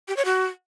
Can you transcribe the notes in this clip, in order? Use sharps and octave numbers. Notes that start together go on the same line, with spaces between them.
G4
C#5
F#4